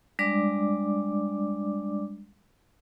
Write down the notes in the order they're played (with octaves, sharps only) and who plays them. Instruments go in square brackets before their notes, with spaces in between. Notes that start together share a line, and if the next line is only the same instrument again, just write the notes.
[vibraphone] G3 G#3 D4 D5 D6